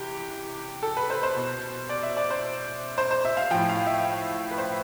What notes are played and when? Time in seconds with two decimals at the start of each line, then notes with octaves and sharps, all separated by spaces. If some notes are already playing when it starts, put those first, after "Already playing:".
Already playing: C3 E3 G4
0.83 A4
0.97 B4
1.10 C5
1.23 C5
1.36 B2
1.89 D5
2.03 E5
2.17 D5
2.30 C5
2.98 C5
3.11 C5
3.25 E5
3.37 F5
3.51 A2 F3 G5
3.69 F5
3.87 E5
4.51 B4
4.58 C5